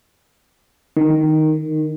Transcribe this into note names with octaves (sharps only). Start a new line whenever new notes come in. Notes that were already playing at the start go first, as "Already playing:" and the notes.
D#3